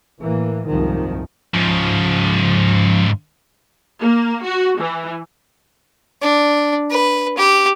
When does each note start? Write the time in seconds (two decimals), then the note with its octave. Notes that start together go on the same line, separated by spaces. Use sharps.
0.22 A2 E3 A#3
0.67 F#1 C2 G#2 D#3 F3
1.54 G#2 C#3 F3
4.01 A#3
4.45 F#4
4.80 E3
6.22 D4
6.90 B4
7.37 G4